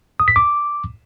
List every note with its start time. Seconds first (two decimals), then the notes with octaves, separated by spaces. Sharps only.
0.20 D#6
0.28 B6
0.36 D6